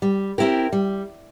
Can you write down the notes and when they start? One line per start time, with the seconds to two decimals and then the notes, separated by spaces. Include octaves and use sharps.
0.02 G3
0.38 C4 E4 G4 A#4
0.72 G3